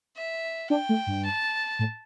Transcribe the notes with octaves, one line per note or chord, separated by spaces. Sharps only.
E5
D4 G5
A3
G2
A5
A2